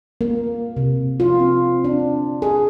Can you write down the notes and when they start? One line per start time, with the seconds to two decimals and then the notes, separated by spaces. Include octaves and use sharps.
0.21 A#3
0.77 C3
1.20 F4
1.40 C4
1.84 D4
2.42 G#4